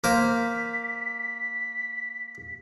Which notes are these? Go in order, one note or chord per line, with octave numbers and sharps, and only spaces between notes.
A#3 C5 B6